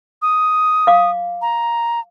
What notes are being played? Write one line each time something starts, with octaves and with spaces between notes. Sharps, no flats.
D#6
F5 D6
A#5